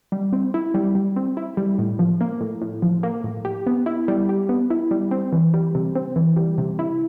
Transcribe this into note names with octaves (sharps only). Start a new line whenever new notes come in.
G3
C4
E4
G3
G3
C4
E4
G3
A2
F3
A#3
A2
A2
F3
A#3
A2
G4
B3
E4
G3
G4
B3
E4
G3
C4
E3
G3
C3
C4
E3
G3
C3
E4